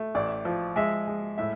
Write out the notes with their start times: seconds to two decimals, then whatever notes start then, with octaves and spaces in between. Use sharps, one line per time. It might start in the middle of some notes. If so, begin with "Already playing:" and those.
Already playing: A3
0.15 A1 D5
0.45 F3
0.76 G#3 E5
1.07 G#3
1.38 A2 E5